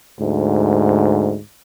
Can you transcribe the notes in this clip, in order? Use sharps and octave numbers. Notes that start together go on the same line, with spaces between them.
D2 G#2